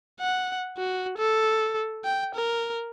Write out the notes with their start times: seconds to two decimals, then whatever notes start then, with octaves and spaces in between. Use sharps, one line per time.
0.20 F#5
0.77 F#4
1.18 A4
2.04 G5
2.35 A#4